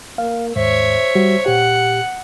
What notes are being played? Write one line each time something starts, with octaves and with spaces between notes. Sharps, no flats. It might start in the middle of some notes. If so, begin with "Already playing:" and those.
A#3 F5
D#2 G#2 C5 C#5 E5
G3 F#4
A#2 G4 F#5